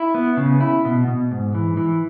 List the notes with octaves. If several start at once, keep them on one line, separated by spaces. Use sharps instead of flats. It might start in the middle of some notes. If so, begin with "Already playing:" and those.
Already playing: E4
B3
C#3
E4
B2
B2
G#2
E3
E3